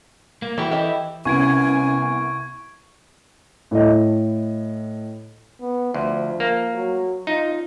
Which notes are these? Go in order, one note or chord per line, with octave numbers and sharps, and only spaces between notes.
A#3
E3 E4 F#4 G4
G4 A4 D#5
C2 B3 C#4 G#5 C#6 G#6 D7
A2 D#5
B3
D2 F3
A#3
F#3
D#4 F4